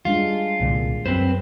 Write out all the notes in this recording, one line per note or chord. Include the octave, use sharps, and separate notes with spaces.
G3 G#3 D4 F4
C2 A#2 D3
F#2 C4 B4 C5